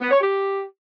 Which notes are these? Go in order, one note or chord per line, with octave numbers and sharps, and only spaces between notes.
B3
C#5
G4